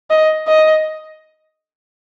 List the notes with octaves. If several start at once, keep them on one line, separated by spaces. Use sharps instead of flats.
D#5
D#5